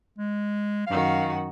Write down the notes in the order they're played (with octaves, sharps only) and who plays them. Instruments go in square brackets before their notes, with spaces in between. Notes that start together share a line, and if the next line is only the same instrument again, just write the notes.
[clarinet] G#3
[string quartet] F#2 D#3 F#4 [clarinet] F5